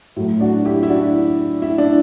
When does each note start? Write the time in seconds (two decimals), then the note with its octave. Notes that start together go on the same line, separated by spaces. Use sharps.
0.16 A2 F#3 A3 E4
0.40 D4 F#4
0.65 E4 G4
0.83 E4
0.89 D4 F#4
1.62 E4
1.78 D4